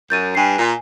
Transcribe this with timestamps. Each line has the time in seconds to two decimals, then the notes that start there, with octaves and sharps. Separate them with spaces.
0.10 F#2 G6 A6 D#7
0.35 G2 G#5 C7
0.58 A#2